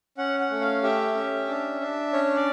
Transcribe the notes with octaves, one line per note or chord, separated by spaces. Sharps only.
C#4 F#5
F#5
A3
F5
G4 E5
C#4
D4
D4
C#4 C#5
D5